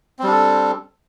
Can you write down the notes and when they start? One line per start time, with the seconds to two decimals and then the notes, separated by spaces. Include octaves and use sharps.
0.19 C4
0.23 G3
0.27 D4
0.31 A4